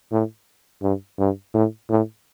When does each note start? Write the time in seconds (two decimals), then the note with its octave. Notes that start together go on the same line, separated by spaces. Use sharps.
0.12 A2
0.82 G2
1.19 G2
1.54 A2
1.90 A2